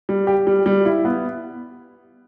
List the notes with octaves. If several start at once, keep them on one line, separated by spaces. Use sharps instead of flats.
G3
G4
G3
G3
E4
B3